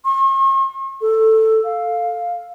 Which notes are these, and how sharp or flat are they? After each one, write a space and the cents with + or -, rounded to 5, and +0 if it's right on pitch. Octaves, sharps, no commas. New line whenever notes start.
C#6 -45
A4 +10
F5 +5